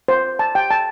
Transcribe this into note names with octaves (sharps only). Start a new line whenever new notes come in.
C5
A5
G5
A5